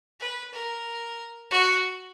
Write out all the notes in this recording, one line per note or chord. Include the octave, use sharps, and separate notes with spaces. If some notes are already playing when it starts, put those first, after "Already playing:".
B4
A#4
F#4